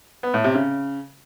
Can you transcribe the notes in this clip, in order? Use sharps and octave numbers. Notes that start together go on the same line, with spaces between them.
B3
A2
C3
C#3